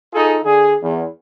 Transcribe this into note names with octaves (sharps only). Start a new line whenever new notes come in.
D#4 F4 G#4 A4
D3 G#4
E2